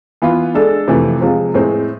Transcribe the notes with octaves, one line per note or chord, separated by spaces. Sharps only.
E3 B3 F4
G#3 D4 A4
F2 C3 E3 A3
C3 F3 G#3
A2 G#3 C4